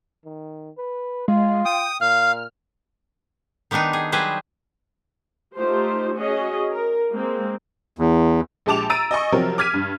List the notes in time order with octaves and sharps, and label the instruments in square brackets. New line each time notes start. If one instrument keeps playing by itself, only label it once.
[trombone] D#3
B4
[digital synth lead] G#3 [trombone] F4
[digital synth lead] G5 [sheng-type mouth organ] D#6
[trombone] A#2 [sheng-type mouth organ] F5 [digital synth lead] F6
[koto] D#3 G3 B3 D4 D#4
G#4
F#3 G3 G#4 B4 C5
[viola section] A3 D#4 F4 G4 C5
C#4 F#4 G#4 D#5
A#4
G#3 A#3 C4
[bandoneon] E2
[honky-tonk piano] A#1 G#3 G4 A5 D6 F7
A#5 E6 A6 D7 D#7
D#5 G#5 C#6
C3 F3 F#3 C4 A#4
D6 F6 G#6 B6 D#7
G2